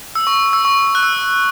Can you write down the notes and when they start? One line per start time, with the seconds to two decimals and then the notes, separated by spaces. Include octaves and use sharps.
0.15 E6
0.27 C#6
0.53 E6
0.65 C#6
0.95 F#6
1.03 E6